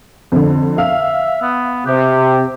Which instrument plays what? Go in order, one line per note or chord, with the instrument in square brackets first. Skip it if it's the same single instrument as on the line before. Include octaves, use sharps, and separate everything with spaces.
[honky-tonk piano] F2 D3
[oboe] E5 [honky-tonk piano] F5
[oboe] B3
[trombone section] C3 [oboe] G4